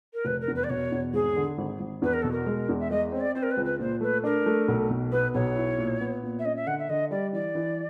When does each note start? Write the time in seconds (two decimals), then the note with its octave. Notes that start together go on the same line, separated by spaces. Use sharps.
0.13 A#4
0.25 F1 B4
0.40 A#4
0.48 E2
0.55 B4
0.63 D5
0.69 B2 C#5
0.92 E2
1.13 G#1 G#4
1.36 D3
1.58 G#1
1.80 G#1
2.02 E2 B4
2.12 A#4
2.21 B2 A4
2.31 A#4
2.46 G#3
2.69 E2
2.79 E5
2.90 G#3 D#5
3.12 C4 C#5
3.20 D5
3.35 C4 C5
3.42 A#4
3.50 B4
3.57 C#2
3.64 B4
3.79 A#2 C5
4.01 A3 B4
4.24 D4 A#4
4.46 A3
4.68 B1
4.90 B2
5.11 B3 B4
5.34 B1 C#5
5.56 E4
5.78 A#2
6.01 B3
6.23 A#2
6.38 E5
6.45 C#4 D#5
6.56 E5
6.66 D3 F#5
6.78 E5
6.89 D3 D#5
7.11 G3 D5
7.33 E3 D5
7.55 E3